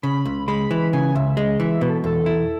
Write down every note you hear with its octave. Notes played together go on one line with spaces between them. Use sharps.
C#3 B5
C#2
G#3 B5
E3
C#3 G#5
C#2 E5
G#3 D#5
E3 E5
B2 B4
A4
E2 A4
E4